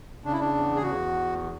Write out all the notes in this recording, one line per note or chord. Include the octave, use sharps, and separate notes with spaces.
C#3 D4
E4
D4
E2
G#4
E2 F#4